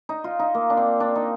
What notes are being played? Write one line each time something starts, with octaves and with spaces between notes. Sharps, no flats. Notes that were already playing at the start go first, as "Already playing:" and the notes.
D#4
F4
D#4
A#3
D4
C4
D4
D#4